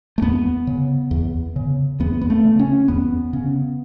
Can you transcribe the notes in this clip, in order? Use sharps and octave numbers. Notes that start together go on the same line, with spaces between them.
A3
E2 B3
C#3
E2
C#3
E2 B3
B3
A3
C#3
C#4
E2 B3
C#3